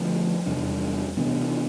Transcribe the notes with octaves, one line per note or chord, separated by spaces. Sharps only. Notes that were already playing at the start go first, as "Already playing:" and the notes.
Already playing: D3 F3 A3 C4
E2 C3 G3 D4
C3 E3 B3 D4